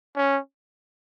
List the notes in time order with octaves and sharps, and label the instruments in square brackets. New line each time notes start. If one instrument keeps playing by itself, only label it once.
[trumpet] C#4